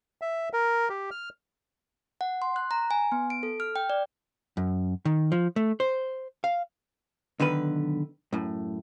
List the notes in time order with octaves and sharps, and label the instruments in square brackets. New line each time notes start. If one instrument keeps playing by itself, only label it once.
[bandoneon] E5
A#4
G4
F6
[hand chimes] F#5
C6
F#6
A#5
G#5
B3
D7
A4
F6
G5
D5
[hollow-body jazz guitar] F#2
D#3
F3
A3
C5
F5
B1 D3 D#3 B4
F#2 A2